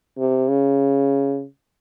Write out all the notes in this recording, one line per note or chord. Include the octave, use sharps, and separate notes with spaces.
C3
C#3